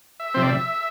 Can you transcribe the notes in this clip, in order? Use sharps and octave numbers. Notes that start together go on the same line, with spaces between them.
E5
C3 F3 C4 C5
D5
E5